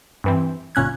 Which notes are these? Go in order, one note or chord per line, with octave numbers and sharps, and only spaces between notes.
G2 E3 C4
G1 A#2 C#4 F#6 G#6